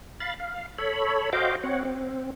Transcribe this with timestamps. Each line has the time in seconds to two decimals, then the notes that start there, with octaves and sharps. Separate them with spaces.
0.20 F5 B5 A6
0.40 F5
0.78 A4 C#5 B5
1.33 F#4 C5 D#5 F5 G5 D6
1.64 C4 C#5 F#5
1.85 C4